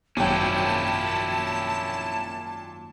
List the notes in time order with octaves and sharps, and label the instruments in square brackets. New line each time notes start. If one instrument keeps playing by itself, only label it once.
[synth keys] G#1 F#2 [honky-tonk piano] A#2 G5 [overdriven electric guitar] C#4 E4 [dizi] A5